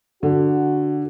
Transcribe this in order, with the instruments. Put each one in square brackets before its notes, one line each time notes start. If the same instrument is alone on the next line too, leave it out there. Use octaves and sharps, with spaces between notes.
[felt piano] D3 [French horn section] F#4